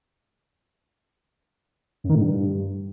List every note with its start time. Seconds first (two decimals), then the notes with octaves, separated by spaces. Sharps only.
2.04 F#2
2.10 D#3
2.15 A2
2.21 G2